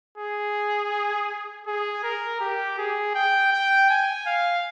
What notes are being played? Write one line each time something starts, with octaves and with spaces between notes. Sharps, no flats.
G#4
G#4
A#4
G4
G#4
G5
G5
G#5
F5